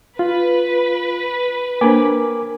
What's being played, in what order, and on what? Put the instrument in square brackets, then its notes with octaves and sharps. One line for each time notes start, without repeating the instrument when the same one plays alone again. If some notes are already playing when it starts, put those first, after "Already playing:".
[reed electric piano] F4 [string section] B4
[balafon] A#3 D4 C5 [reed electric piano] A#4 G#5 D6